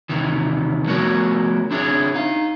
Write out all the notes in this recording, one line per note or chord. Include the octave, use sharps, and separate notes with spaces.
D#2 C3 D#3 E3
F3 A3 B3 F#4 A#4 C#5
C4 D4 E4 G#4 C#5
D#4 F5